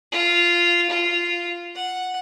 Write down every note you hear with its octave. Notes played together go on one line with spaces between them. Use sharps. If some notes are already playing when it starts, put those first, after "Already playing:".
F4
F4
F#5